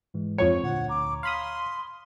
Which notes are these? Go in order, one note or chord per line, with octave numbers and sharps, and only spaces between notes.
G#2 E3 G#3
F2 F3 C#5 C#6
D2 A#2 F#5
A#5 D6
F5 B5 C6 D#6